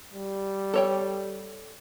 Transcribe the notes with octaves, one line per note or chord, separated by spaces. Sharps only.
G3
A4 C#5 G5